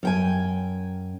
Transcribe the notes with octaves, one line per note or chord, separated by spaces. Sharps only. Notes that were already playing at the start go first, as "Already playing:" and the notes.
F#2 G5 G#5